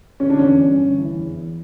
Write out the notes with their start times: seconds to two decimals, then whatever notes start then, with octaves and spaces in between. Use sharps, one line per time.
0.20 D3 C#4
0.30 D4
0.39 E2 C#4
0.59 G2
0.78 D3
0.98 E3
1.18 E2
1.36 E3